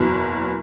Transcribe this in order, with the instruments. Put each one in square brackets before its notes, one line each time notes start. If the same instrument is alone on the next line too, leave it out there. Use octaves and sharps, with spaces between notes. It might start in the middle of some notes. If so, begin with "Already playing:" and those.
Already playing: [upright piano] F#1 E2 B2